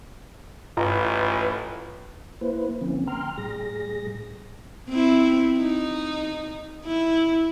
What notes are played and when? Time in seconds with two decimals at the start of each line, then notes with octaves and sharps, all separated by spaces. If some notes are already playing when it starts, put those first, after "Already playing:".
0.77 A1 G2 F4 B4 D#5 A#5
2.41 A#3 E4 B4 C5
2.81 D3 F3 A#3 C4 C#4
3.07 G5 A#5 C6 F6
3.37 A2 G3 G#4 A#6
4.89 C4 E4
5.59 D#4
6.85 E4